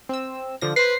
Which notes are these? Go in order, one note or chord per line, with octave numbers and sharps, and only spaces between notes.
C4 E6
D3 F3 A#6
B4 C5 A#6 C7